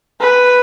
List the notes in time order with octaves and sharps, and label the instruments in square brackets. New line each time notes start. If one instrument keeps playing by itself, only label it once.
[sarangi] B4